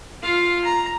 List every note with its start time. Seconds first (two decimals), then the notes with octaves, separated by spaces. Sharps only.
0.22 F4 F5
0.64 A#5